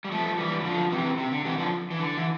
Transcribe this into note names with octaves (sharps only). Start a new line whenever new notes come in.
G3
F3 A3
E3 G3
E3
D3 F3
C3 E3
C3
D3
C3 E3
D3 F3
E3
D3
E3